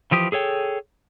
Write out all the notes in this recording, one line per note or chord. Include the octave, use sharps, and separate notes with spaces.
E3 F3 G4 D#6
G#4 A4 C#5 G5